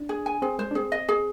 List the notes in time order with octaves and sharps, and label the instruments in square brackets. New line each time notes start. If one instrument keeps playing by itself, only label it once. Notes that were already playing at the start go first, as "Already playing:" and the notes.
Already playing: [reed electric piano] D4
[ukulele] G#4
G#5
[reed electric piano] C4 [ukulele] G#4
[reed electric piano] G#3 [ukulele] C5
[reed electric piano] D4
[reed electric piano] C4 [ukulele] G#4
[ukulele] D#5
G#4